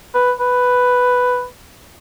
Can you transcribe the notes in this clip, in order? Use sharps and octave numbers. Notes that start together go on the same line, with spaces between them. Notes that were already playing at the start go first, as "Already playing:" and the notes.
B4
B4